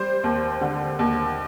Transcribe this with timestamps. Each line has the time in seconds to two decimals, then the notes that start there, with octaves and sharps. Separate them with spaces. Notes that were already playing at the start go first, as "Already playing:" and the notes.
Already playing: G3 C5
0.24 D#2
0.61 D3
0.99 D#2